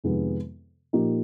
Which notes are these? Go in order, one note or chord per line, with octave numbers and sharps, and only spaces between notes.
F2 C3 D#3 G#3 B3
A#2 F3 A#3 D#4 G4